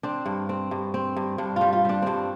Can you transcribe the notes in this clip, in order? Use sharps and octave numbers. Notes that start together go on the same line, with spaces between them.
C4 D4
G2
C4
G2
C4
G2
G2 D4
G3 F4
F4
G3 D4
G2 C4 D4